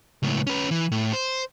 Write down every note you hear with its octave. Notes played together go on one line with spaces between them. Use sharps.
C#2 A2
C#4 B4
E3
A2
C5